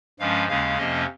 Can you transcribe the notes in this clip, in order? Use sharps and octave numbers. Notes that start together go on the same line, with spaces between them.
G2 F3 G#3 C#4 F5
D#2 C#3 G#3 C#4 F5
F2 C3 F3 A#3 C#4 D#5